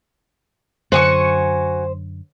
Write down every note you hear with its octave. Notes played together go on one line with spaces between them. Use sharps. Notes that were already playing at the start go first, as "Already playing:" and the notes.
F#2 D3 F#4 C5 G#5 C#6